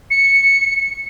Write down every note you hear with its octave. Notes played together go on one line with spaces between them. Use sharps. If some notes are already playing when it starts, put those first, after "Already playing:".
C#7